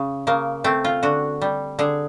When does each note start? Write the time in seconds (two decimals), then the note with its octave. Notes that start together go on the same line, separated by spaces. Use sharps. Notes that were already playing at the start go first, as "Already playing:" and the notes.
Already playing: C#3
0.27 C#3 A#3
0.64 A3 C4
0.85 F4
1.03 D3 F#4
1.42 G3
1.79 D3 G#4